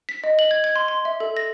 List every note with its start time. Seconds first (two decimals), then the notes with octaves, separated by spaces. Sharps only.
0.09 B6
0.24 D#5
0.39 F#7
0.51 G#6
0.64 G#6
0.76 C6
0.88 C6
1.05 E5
1.20 A4
1.37 A#6